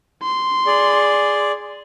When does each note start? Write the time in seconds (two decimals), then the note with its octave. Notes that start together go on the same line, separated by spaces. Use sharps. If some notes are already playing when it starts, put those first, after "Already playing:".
0.23 C6
0.67 G#4 D5